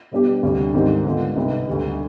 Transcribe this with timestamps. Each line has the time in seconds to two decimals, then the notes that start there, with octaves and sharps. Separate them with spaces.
0.12 B2 G3 B3 D4 G4
0.43 D2 C3 G3 D4
0.74 G#2 D#3 G3 C4
1.05 D3 G#3 B3 F4
1.36 C2 B2 B3 D#4
1.68 D2 D3 G3